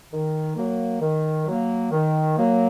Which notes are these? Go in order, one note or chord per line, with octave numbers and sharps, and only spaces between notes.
D#3
F#3 A#3
D#3
F#3 A#3
D#3
F#3 A#3